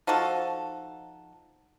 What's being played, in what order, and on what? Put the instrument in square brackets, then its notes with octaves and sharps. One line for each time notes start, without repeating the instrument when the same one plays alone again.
[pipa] F3 D#4 F#4 A4